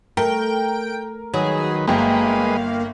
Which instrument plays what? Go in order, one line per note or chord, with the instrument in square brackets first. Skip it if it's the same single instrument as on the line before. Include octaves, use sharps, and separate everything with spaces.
[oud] A3 [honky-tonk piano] A#4 [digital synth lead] G5
[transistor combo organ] D#3 B4 [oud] F#3 [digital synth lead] G#4
[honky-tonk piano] G1 G5 [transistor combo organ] G#3 B4 D#5 [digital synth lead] A#3